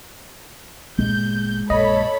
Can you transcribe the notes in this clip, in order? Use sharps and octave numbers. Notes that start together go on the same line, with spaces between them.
G1 A#2 G#3 G6
A#1 F#2 A4 C#5 D#5 B5